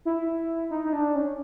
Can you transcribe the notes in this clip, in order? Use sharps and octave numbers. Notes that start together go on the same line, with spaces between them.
E4
D#4
D#4
D4
C#4